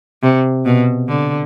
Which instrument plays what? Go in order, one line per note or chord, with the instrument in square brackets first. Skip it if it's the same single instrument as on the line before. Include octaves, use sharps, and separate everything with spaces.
[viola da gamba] C3
B2
D3